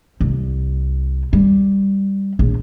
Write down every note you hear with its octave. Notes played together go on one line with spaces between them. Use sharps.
C2
G3
A#1